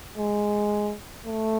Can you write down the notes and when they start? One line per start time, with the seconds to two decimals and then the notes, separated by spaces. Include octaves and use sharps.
0.17 G#3
1.26 A3